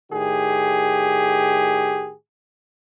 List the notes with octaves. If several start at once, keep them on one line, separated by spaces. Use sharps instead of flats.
A2 D#3 G4 G#4